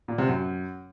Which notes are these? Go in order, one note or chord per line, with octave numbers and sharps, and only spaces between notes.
A#2
C3
F#2